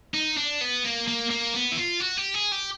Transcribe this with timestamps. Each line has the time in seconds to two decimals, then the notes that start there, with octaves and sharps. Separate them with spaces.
0.14 D#4
0.38 D4
0.61 B3
0.84 A#3
1.08 A#3
1.30 A#3
1.54 B3
1.72 E4
1.77 F4
2.00 F#4
2.17 G4
2.34 G#4
2.52 G4